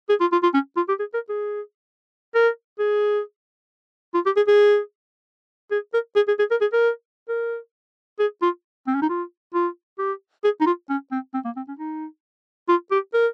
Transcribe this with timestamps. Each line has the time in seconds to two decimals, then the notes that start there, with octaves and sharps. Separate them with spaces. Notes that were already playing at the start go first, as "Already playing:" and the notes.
0.09 G#4
0.20 F4
0.32 F4
0.43 F4
0.54 C#4
0.76 F4
0.88 G4
0.99 G#4
1.14 A#4
1.29 G#4
2.35 A#4
2.79 G#4
4.14 F4
4.26 G4
4.36 G#4
4.47 G#4
5.71 G#4
5.94 A#4
6.16 G#4
6.28 G#4
6.39 G#4
6.51 A#4
6.61 G#4
6.72 A#4
7.29 A#4
8.19 G#4
8.42 F4
8.87 C4
8.94 C#4
9.02 D#4
9.09 F4
9.54 F4
9.99 G4
10.44 G#4
10.61 D#4
10.66 F4
10.89 C#4
11.11 C4
11.34 C4
11.45 A#3
11.56 C4
11.68 C#4
11.79 D#4
12.68 F4
12.91 G4
13.13 A#4